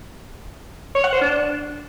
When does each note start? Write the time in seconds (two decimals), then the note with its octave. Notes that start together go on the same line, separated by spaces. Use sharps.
0.95 C#5
1.04 F#5
1.12 C5
1.21 D4